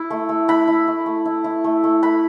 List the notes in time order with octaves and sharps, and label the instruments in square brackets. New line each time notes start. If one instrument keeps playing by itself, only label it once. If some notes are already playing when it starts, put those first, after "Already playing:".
Already playing: [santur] E4
A3
A3
E4 B5
E4
A3
A3
E4
E4
A3
A3
A3 B5